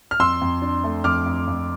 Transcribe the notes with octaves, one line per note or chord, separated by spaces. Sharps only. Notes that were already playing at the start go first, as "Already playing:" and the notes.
F6
F2 C6 E6
F2
D4
A3
F2 D6 F6
F2
F2